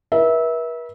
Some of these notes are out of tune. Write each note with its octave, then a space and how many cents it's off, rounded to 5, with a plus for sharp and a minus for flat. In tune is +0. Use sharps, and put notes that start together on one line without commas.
B4 -45 E5 -20